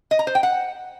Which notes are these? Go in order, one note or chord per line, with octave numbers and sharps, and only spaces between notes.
D#5
A#5
C5
G5
F#5